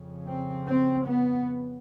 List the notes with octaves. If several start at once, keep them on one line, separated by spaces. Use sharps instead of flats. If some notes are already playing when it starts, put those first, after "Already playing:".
Already playing: F2 C#3
C4
C4
B3